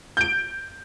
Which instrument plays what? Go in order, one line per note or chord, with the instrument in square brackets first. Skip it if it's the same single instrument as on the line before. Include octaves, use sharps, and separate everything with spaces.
[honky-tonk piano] G6 D7